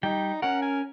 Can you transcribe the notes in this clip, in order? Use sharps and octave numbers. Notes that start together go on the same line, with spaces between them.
G3 D#4 G5
C#4 A#4 F#5
G#5